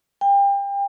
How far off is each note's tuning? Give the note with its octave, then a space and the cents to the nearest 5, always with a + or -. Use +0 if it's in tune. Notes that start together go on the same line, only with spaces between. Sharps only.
G5 +30